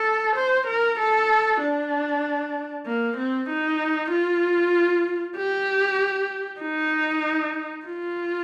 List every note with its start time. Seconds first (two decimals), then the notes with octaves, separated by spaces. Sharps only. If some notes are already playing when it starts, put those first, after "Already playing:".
Already playing: A4
0.35 C5
0.67 A#4
0.99 A4
1.61 D4
2.86 A#3
3.17 C4
3.49 D#4
4.10 F4
5.36 G4
6.61 D#4
7.86 F4